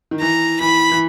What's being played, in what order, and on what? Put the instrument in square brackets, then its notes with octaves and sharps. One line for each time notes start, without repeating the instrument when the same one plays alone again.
[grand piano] D#3
[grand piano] E3 [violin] A#5
[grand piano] E3 [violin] B5
[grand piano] E3